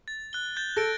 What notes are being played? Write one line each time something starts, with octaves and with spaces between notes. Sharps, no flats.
A6
F#6 G7
G6 A6 G7
A4 A#6 D7